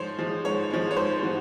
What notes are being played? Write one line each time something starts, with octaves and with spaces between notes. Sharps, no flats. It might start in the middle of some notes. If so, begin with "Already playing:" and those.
Already playing: G#2 F3 G#3 C5 C#5
F3 G#3
G#2 C#5
F3 G#3
C#5
G#2 C5
F3 F#4